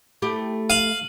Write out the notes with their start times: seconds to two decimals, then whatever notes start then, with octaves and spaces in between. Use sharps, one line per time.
0.22 A3 E4 G4
0.70 F5 D#7 F#7